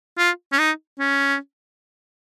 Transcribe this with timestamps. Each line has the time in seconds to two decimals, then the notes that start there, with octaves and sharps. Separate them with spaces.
0.18 F4
0.52 C#4
0.59 D#4
1.00 C#4